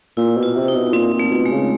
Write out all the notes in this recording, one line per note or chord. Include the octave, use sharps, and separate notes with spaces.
A#2 E4
B2
F4
C3
D#4
B2
A#2 C4
A#2
A3
B2
G#3
C#3